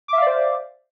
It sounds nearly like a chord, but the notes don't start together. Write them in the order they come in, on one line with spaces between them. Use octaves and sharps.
D6 E5 F5 D5 C5